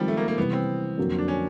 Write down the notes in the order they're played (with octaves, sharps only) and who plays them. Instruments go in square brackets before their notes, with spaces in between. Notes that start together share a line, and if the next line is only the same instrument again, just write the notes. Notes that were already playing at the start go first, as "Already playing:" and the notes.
Already playing: [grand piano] D#3 G#3 C4 [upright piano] F3 G3
[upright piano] A3
A#3
A#3
[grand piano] C3 E3 G3 [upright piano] B3
[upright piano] C4
[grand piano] F2 D3 F#3 A#3
[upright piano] D4
C#4